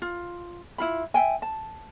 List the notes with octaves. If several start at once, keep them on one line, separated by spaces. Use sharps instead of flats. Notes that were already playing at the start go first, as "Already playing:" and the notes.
F4
E4 F4 B5
E5 F5 G5 G#5
A5